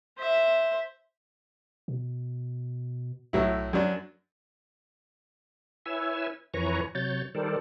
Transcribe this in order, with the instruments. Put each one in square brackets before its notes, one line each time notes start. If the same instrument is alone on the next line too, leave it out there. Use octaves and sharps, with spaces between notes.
[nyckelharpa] C5 E5
[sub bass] B2
[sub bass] B1 [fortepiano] A2 F#3 E4
[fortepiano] F#2 F#3 D4
[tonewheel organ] E4 B4 C#5 E5 G#5 E6
F2 E3 B4 C#5 A#5 C#6
C3 F#3 C#5 G6 A6
D#3 G3 A4 A#4 C5 D5